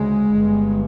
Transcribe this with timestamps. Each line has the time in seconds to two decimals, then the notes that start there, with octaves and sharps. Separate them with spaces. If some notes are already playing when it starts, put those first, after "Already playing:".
Already playing: D2 C#3 G#3
0.30 G1 G2